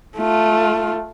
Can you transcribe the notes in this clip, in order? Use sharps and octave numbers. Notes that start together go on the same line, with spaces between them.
A3 F4